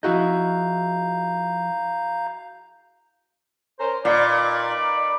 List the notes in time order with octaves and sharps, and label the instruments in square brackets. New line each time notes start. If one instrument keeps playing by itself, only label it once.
[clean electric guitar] F3 D#5 [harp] E4 F#4 G#4 [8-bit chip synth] F5 A#5 G6
[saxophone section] C#4 A#4 C5
[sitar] A#2 [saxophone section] D#4 B4 D5